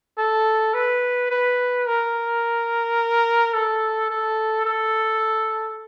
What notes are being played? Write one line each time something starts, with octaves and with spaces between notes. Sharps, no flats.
A4
B4
B4
A#4
A4
A4
A4